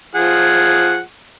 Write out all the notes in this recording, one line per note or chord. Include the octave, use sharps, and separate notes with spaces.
F3 G#4 F#5